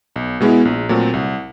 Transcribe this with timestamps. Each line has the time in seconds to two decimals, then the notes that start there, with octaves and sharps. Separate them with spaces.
0.16 B1
0.40 B2 G#3 B3 E4
0.65 A#1
0.89 A#2 F#3 A3 C4
1.14 C2